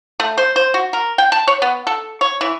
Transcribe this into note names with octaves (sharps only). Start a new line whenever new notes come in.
A3
C5
C5
F#4
A#4
G5
A5
C#5
B3
A4
C#5
E3